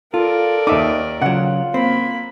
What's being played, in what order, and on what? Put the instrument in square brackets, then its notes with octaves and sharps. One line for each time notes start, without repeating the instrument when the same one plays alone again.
[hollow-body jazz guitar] F4 [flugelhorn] A4 [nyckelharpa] A#4 D5
[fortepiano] D#2 E5 D6 [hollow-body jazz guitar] D#4
[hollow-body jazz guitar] C#3 F#3 [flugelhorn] F4 [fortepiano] F#5
[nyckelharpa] A#3 B5 [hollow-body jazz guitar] C4